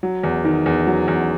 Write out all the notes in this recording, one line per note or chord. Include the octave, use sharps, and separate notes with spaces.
F#3
E2
D#3
E2
F#3
E2